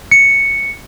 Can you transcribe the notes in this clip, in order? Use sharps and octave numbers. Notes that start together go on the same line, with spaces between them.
C#7